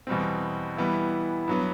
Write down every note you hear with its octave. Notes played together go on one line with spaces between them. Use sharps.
E2 B2 G3 C4
E3 G3 B3 E4
G2 F#3 B3